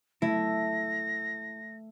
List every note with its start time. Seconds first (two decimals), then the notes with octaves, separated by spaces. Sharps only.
0.22 A3 E4 A#6